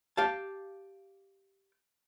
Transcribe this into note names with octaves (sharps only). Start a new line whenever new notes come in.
G4 F5 A5